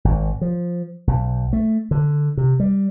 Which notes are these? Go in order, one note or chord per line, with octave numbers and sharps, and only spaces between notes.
G#1
F3
B1
A3
D3
C3
G3